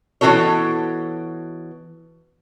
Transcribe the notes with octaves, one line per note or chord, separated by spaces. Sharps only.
B2 E3 D#4 F#4 A4 C#5